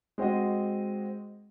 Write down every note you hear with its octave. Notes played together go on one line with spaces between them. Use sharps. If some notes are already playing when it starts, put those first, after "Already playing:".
G#3 C4 F#4 D#5